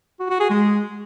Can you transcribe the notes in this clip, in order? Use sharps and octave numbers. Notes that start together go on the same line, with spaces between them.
F#4
F#4
G#4
G#3